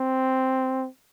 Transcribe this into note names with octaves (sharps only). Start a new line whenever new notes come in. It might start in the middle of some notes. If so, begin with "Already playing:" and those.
Already playing: C4